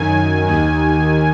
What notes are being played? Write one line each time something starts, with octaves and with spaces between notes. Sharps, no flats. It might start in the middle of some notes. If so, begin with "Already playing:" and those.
Already playing: F#2 D#3 G#5
D#2 D#3